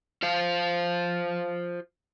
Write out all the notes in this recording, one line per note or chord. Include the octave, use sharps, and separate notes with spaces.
F4 C5 F5